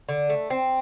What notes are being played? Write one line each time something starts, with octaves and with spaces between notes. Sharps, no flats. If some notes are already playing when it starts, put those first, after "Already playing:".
D3
A3
C4